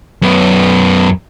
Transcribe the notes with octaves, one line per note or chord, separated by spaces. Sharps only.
F#2 B3